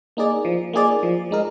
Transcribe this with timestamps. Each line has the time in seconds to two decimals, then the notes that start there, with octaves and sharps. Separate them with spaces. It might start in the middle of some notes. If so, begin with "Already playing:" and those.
0.17 A#3 D#4 G#4 D5
0.45 F3
0.73 A#3 D#4 G#4 D5
1.03 F3
1.31 G#3 D#4 A#4